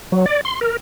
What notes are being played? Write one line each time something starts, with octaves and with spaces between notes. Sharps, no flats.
F#3
D5
C6
A#4